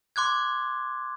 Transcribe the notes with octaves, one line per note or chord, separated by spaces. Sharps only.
C6 D6 F#6 G#6